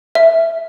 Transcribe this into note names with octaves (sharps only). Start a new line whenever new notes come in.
E5